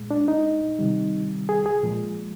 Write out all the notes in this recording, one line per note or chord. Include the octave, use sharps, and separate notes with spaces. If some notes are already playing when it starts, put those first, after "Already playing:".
Already playing: A#2 G#3
D4
D#4
C3 D#3 G3
G#4
G#4
A#2 F3 G#3